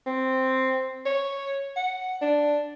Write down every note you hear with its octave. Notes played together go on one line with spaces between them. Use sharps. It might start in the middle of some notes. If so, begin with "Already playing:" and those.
C4
C#5
F#5
D4